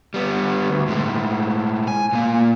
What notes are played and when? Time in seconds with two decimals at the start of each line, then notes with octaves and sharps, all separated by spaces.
0.14 G3 B3
0.70 D2
0.88 A2 G#3
1.88 G#5
2.13 A#2 A#3